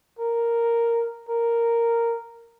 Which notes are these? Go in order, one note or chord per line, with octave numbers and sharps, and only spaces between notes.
A#4
A#4